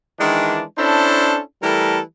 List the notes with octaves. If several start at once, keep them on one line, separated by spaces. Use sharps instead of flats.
D#3 E3 G#3 D4
C#4 D4 E4 A4 C5
E3 G3 A3 A4 A#4